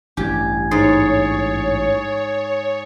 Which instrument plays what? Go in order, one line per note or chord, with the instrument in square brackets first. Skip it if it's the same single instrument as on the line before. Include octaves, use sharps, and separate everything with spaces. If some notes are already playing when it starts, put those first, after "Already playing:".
[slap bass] A1 G2 [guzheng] G4 [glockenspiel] G#5 G#6
[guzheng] G#2 [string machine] C#5 [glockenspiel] D#6 A6 C7